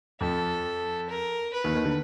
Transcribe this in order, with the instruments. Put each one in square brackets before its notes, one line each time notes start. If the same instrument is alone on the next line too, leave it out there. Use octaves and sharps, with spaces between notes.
[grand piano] F2 F3 [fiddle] A4
[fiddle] A#4
B4
[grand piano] D#2 D#3
D#2 D#3
D3